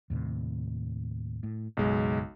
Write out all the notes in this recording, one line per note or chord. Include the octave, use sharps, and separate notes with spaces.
D#2 A2 C3
A2
F#1 B1 G#3